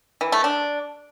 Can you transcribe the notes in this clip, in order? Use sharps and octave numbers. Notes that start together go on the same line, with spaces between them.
E3
A3
D4